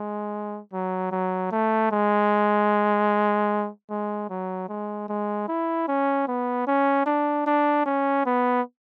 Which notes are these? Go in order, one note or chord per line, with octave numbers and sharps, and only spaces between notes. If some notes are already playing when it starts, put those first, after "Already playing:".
Already playing: G#3
F#3
F#3
A3
G#3
G#3
F#3
G#3
G#3
E4
C#4
B3
C#4
D4
D4
C#4
B3